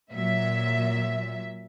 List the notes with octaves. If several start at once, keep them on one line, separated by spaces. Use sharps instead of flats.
A#2 F#3 E5